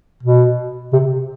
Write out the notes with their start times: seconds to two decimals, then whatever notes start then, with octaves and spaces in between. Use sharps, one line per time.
0.23 B2
0.93 C3